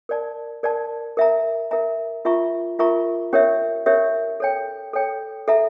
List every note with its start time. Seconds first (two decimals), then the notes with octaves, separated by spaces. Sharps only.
0.09 A#4 D5 A5
0.63 A#4 D5 A5
1.17 A#4 E5 A#5
1.71 A#4 E5 A#5
2.25 F4 A#4 E5 A#5 C#6
2.79 F4 A#4 E5 A#5 C#6
3.33 C#4 G4 A#4 C#5 E5
3.86 C#4 G4 A#4 C#5 E5
4.40 A4 C#5 G5
4.94 A4 C#5 G5
5.48 A4 E5 A#5